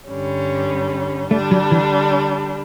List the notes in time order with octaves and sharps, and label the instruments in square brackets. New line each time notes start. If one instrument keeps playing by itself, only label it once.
[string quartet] G2 D3 G3 C#4
[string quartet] D3 G3 D4 [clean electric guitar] A3
[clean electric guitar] F#3
E3